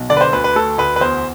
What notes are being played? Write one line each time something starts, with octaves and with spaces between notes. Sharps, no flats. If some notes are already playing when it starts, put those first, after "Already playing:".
Already playing: B1
D3 D5
B4
C5
D2 B4
B4
A3 A4
D2 B4
B4
E2 C5